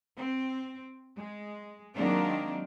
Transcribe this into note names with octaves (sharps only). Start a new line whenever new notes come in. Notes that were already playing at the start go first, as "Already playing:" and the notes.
C4
G#3
D#3 F#3 G#3 A#3 C4 D4